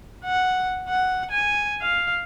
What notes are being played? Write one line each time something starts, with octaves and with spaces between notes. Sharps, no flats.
F#5
F#5
G#5
F5